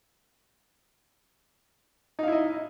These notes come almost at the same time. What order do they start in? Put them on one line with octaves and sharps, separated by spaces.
D#4 F5 E4 D#5